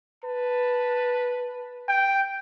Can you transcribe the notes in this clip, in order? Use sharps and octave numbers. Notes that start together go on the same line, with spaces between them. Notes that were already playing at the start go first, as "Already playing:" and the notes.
B4 A5
G5